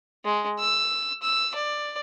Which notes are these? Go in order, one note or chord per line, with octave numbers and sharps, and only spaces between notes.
G#3
E6
E6
D5